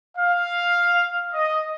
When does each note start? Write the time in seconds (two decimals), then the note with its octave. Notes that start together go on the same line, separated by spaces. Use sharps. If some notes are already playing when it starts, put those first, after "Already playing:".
0.18 F5
1.33 D#5